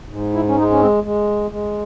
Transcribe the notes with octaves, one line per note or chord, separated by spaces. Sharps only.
G#2
E4
C#4
G#3 D#4
C#4
C4
G#3
G#3